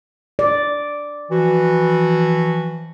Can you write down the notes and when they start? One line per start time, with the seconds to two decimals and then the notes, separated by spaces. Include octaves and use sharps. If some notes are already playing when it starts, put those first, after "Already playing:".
0.39 D5
1.30 E3 F3 F#4